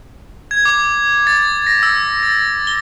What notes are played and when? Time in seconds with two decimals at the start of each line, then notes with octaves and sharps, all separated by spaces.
0.51 G#6
0.65 D6
1.27 A6
1.67 A#6
1.83 E6
2.23 A6
2.67 G7